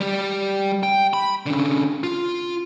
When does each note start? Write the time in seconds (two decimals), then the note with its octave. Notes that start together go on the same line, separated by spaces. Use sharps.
0.01 G3 G4
0.83 G5
1.13 B5
1.46 D3 C#4
2.03 F4